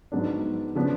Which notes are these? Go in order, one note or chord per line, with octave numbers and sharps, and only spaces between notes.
G#2 F#3 B3 D4
C#3 F3 B3 D4